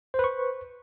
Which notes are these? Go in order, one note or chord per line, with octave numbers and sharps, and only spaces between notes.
B4 C5 C#6